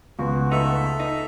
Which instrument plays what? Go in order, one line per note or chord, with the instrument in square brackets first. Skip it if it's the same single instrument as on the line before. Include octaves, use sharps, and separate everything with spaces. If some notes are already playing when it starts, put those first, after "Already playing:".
[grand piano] C#2 [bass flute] B3 [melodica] F#4
[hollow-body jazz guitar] A3 D#4 [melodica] A4 E5
[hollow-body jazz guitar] D#4